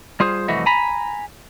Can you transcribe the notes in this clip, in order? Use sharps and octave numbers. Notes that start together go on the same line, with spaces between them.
G3 F4 G#4 C5
C2 F2 E3 A3 F#4 D#5
G#5 A#5 B5